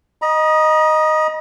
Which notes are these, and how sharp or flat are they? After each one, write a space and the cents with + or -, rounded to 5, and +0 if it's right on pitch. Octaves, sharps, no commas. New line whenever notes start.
D#5 -5 A#5 +40